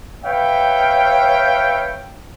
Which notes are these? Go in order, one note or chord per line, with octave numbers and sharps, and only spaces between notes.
B4 C#5 E5 F5 G5